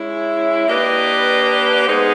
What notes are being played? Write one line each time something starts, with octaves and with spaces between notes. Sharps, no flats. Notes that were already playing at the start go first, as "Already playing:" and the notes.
Already playing: G#3 C#4 E4
A#3 D4 G4 B4 D#5
G#3 B3 D#4 G#4 C5